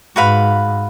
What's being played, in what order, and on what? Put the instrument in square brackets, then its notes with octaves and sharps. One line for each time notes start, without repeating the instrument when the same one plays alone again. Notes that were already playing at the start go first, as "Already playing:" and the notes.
[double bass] G#2 [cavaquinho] F#4 B4 F5 B5